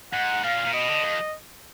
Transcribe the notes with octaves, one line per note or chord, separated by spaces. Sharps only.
G#2 F#5
A#2 F5
A#2
B2 D#5
D3
F2